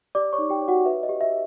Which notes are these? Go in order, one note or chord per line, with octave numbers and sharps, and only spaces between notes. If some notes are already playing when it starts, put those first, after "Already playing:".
G4 D5 D6
C#5 C#6
D#4
G4 G5
C#5
F#4 F#5
B4 E5
D#5
G4
E5